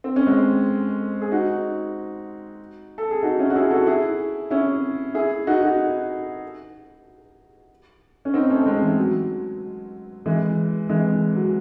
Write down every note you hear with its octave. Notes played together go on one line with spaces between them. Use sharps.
C4
C#4
G#3 C4
G#4
D#4 F#4
A4
G#4
D#4 F#4
C#4 E4
F#4
E4 G#4
F#4 A4
E4 G#4
C#4 E4
E4 G#4
D#4 F#4
D#4 F#4
C#4
C4 D#4
A3 C#4
G#3 C4
E3
F#3
E3 G#3
E3 G#3
F#3